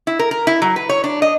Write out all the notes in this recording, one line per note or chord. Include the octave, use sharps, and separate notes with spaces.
E4
A#4
A#4
E4
F#3
B4
C#5
D4
D#5